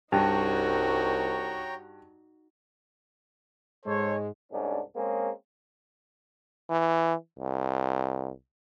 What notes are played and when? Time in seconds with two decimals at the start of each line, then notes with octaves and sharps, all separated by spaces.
0.12 C2 G2 D#4 F#4 C#5 G5 A#5
3.86 G#2 G#3 A4 C5 C#5
4.52 C2 G#2 C#4 D4
4.96 G#3 A#3 C4 C#4 G#4
6.70 E3
7.39 C2